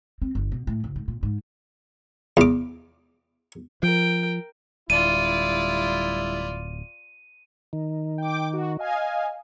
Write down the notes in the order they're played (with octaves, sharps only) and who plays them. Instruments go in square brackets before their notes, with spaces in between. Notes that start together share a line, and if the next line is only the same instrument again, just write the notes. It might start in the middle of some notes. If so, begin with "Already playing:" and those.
[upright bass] C4
G1
B2
A2
F#1
G#2
A#2
G#2
[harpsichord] E2 D6
[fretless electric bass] F3 [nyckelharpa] A#4 G5
[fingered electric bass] D1 [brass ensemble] G3 E4 [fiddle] F4 D5 [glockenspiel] D#7
[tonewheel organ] D#3
[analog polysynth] G5 D6
F#4
D#5 F5 G#5